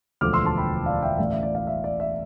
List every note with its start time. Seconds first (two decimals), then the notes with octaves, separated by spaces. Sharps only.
0.21 E1 D2 D3 F3 D6 F6
0.33 C6 E6
0.45 A5 C6
0.58 G5 B5
0.86 D5 F5
1.02 E5 G5
1.18 A1 A2 E3 D5 F5
1.31 E5
1.43 D5
1.55 D5 F5
1.67 E5
1.84 D5
2.00 E5